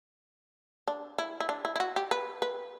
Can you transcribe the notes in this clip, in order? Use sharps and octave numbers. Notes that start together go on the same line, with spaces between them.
D4
E4
E4
D4
E4
E4
F#4
G4
B4
B4